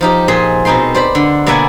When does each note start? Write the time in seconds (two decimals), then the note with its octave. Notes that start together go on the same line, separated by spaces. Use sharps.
0.01 F3 D#4 G4
0.28 A#2 G#4 D#5 C6
0.65 B2 C4 D#4 G5 C6
0.94 C5 D5 B5
1.15 D3
1.46 B2 A#3 D5 E5 F#5 G#5